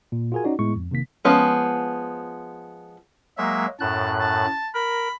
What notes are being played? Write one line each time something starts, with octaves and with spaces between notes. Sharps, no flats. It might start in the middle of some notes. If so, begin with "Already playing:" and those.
A#2
F4 F#4 G#4 A#4 G#5
C#4 D#4 F#4 D5
A2 G#3 B3 E4 C#6
F2
C3 D#3 A#3 B6
F3 G#3 B3 C#4
F#3 G#3 A#3 E5
F#2 A2 A5 F#6
A5
A#4 B5